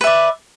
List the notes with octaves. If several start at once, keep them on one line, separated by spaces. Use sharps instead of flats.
B4 D5 E5